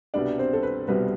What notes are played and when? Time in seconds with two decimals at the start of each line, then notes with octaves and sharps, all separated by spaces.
0.14 C2 B2 G3 B3 D4 D5
0.38 C4 C5
0.53 A4
0.63 B4
0.87 C2 B2 G3 B3 B4